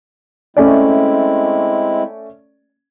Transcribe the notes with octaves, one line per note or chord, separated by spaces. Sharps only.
G#3 A3 C4 C#4 E4 D5